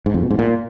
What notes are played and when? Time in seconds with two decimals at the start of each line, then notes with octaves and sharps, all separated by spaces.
0.06 G#2
0.14 F2
0.22 B2
0.31 G#2
0.39 A#2